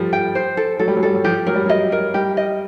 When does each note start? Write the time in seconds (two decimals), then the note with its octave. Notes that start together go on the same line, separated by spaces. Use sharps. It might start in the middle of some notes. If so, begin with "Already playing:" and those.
Already playing: F3 G3 A4
0.13 G5
0.35 C5
0.57 A4
0.79 F#3 A4
0.88 G3
0.97 F#3
1.03 G3 A4
1.14 F#3
1.24 F3 G4
1.46 F#3 A#4
1.56 G3
1.66 F#3 D#5
1.92 A#4
2.14 G3 G4
2.37 D#5